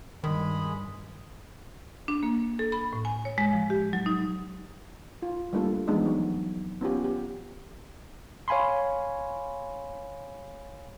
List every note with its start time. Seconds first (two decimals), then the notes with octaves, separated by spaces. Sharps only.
0.24 G2 D#3 G#3 G#4 B5
2.08 D4
2.23 A#3
2.59 A4
2.72 B5
2.93 A2
3.05 G#5
3.25 C#5
3.38 G#3
3.53 F3
3.70 G4
3.93 F#3
4.06 D#4
5.22 F4
5.53 G3 A3 A#3 D4 F4 A4
5.87 E3 F3 G#3 B3 D4 D#4
6.06 F#3 D#4
6.81 B3 C#4 F4 G4
7.04 G4
8.48 C#5 F5 G#5 B5 C6